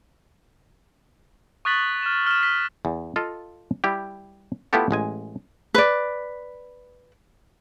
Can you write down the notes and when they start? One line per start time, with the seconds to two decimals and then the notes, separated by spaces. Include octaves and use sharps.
1.65 C#6 D#6 F#6 A6 B6 F#7
2.03 F6 E7
2.27 F6 E7
2.43 B6
2.85 E2
3.16 F4 A4 D#5 F5
3.84 G3 E4 G4
4.73 A3 B3 E4 F4 G4 A4
4.91 A1 G#3 G#5
5.74 B4 D5